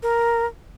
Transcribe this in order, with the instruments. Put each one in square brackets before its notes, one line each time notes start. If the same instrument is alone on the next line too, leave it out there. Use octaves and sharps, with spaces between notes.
[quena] A#4